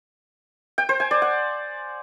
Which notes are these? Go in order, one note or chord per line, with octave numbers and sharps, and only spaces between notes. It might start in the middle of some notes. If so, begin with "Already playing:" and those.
G5
C5
G#5
D5
F#5